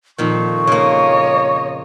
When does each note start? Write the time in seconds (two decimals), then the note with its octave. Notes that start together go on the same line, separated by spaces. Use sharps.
0.18 F2 A#2 D#3 C#6
0.67 C#3 A#3 C#5 D#5